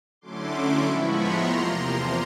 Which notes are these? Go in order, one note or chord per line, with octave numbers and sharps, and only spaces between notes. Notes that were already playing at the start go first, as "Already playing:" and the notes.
D3 F#3 A3 C#4 E4 C6 D6
A2 F3 G#3 B3 E4 B5 C#6
A#5 C6
E2 C3 F3 A#3